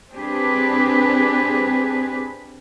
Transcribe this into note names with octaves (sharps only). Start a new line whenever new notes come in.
C4 D4 G4 G#4 B4